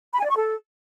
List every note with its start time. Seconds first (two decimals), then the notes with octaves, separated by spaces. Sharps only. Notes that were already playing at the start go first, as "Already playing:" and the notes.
0.13 B5
0.19 G#5
0.25 D5
0.30 C#6
0.36 A4